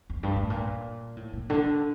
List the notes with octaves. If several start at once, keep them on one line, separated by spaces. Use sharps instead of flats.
F2
G2
A2
A#2
A2
A#2
D3